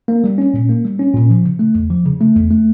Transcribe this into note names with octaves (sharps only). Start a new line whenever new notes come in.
A#3
G3
C#4
A#2
A#3
G3
C#4
A#2
F3
C#3
A3
E2
F3
C#3
A3
E2
A3